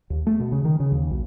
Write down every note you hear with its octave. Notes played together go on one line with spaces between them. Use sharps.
D#2
A3
B2
C#3
D#3
C#3
D#2
B1